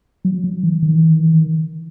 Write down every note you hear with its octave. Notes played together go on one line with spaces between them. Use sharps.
F#3
F#3
E3
D#3
E3
D#3
E3
D#3